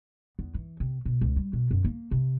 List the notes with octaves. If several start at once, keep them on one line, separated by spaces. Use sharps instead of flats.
E2
E3
C3
B2
C#2
G3
B2
F#2
A#3
C3